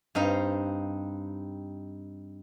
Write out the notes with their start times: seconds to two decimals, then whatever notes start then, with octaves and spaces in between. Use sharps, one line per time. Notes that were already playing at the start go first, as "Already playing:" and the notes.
0.15 G2 C4 D#4 F5